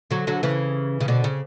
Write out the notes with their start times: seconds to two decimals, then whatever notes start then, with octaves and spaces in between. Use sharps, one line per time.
0.11 D3 F#3
0.27 D3 F#3
0.43 C#3 E3
1.01 C#3
1.08 B2 D3
1.24 C#3